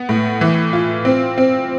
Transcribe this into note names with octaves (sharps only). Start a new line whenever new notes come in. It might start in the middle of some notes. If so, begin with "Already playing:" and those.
Already playing: B3
A2
E3
F4
C4
C4